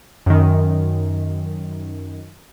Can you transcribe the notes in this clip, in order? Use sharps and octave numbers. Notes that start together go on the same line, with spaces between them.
F#2 D#3